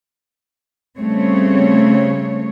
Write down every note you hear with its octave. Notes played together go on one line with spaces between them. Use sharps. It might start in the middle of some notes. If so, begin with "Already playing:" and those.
C#3 G3 A3 C4 C#5